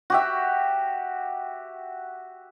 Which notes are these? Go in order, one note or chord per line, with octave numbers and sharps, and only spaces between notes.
F#4 G4 E5